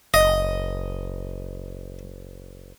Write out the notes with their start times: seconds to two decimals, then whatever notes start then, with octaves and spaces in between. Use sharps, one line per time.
0.14 F#1 D#5